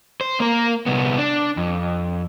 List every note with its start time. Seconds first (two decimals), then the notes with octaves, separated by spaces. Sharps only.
0.21 C5
0.40 A#3 A#4
0.86 C2 B3
1.18 D4
1.57 F2